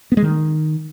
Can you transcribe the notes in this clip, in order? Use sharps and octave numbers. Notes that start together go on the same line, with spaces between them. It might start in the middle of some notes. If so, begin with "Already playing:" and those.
B3
G#3
D#3